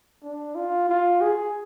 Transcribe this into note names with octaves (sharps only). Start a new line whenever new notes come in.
D4
F4
F4
G#4